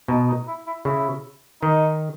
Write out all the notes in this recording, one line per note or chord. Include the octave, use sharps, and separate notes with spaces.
B2 D#4
D#4
E4
E4
C#3 E4
D#3 D#4